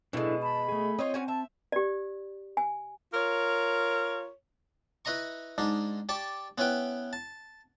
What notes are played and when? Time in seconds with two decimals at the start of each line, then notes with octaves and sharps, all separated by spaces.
0.13 B2 G#3 D4 E4 A4
0.43 A5 B5
0.69 A3 G#4
0.99 C4 F4 C#5 D#5
1.14 C#4 F#4 G#5
1.28 E5 A5
1.72 G4 D5
2.57 G#5
3.14 F4 A#4 C#5
5.05 E4 B4 D#5 A#5 C#6
5.58 G#2 D4 D#4
6.09 G4 D5 A5 C#6
6.58 B3 C#4 E4 B4 G5
7.13 A5